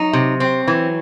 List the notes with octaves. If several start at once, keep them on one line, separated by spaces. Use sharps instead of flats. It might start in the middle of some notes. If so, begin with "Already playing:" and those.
Already playing: F#3 D#4
C3
F#3 C4
E3